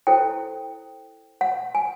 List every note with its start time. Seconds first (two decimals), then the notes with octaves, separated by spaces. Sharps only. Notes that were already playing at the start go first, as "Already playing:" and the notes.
0.07 E4 A4 C5 G5
1.41 F#5
1.75 G#5